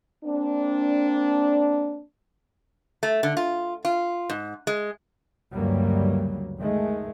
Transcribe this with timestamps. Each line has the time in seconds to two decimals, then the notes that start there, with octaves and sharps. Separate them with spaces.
0.24 A#3 C4 D4
3.03 A3
3.23 D3
3.37 F4
3.85 F4
4.30 G#2
4.67 G#3
5.53 D2 G2 C#3 F#3 G3 A#3
6.58 D#3 G#3 A3